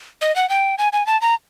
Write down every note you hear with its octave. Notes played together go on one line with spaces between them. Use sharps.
D#5
F#5
G5
G#5
G#5
A5
A#5